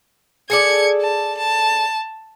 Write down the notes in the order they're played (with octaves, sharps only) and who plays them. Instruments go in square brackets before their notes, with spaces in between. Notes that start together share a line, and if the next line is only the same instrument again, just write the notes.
[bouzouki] G#4 A4 D5 [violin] G#6 C#7
[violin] A5
A5